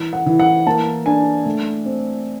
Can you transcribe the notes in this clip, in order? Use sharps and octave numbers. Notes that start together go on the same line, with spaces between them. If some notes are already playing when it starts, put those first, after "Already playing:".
Already playing: E3
F#5
E3
F#5
A#3 A5
D4 G#5
A3
C4